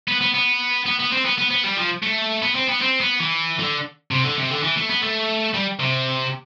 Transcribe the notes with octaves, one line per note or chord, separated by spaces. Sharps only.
B3
B3
B3
B3
B3
C4
B3
B3
B3
G3
F3
A3
B3
C4
B3
C4
B3
E3
D3
C3
D3
C3
D3
E3
A3
B3
A3
G3
C3